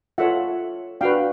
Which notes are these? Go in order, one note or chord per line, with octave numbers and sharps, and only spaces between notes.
F4 A4 C#5 E5 F#5
D4 F#4 B4 F5 G5